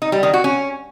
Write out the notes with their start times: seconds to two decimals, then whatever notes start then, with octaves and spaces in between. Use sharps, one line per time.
0.02 D#4
0.12 G3
0.23 D#3
0.34 F#4
0.44 C#4